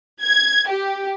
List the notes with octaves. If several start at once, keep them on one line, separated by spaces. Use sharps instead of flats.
G#6
G4